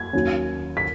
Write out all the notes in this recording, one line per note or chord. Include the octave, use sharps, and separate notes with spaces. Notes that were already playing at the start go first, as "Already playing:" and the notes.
Already playing: G#6
D#2 D#3 F#3 C#4
B6